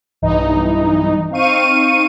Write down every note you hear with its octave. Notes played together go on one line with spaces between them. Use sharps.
B1 G2 E3 D#4
C4 D#4 F5 C#6 D#7